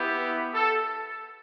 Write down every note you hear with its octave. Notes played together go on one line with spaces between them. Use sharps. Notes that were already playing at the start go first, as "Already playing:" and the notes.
Already playing: B3 E4 G4
A4